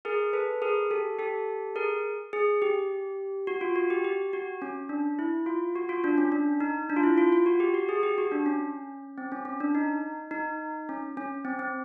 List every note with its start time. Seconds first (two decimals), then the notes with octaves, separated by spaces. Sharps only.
0.05 G#4 A#4
0.33 A4 B4
0.62 G#4 A#4
0.90 G4 A4
1.19 G4 A4
1.75 G#4 A#4
2.33 G#4
2.62 G4
3.47 F#4
3.61 F4
3.76 F#4
3.90 G4
4.04 G4
4.33 F#4
4.62 C#4
4.89 D4
5.19 E4
5.46 F4
5.76 F#4
5.89 F4
6.04 D4
6.18 C#4
6.32 D4
6.60 D#4
6.90 D4
6.96 F4
7.03 E4
7.18 F4
7.32 F4
7.46 F#4
7.60 G4
7.74 F#4
7.89 G#4
8.03 G4
8.18 F#4
8.32 D4
8.46 C#4
9.18 C4
9.32 C#4
9.45 C#4
9.60 D4
9.75 D#4
10.31 D#4
10.89 C#4
11.17 C#4
11.45 C4
11.59 C4